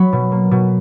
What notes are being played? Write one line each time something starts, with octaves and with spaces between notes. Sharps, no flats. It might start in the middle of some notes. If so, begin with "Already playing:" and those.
Already playing: F#3 B5 C#6
B2
A#3
B2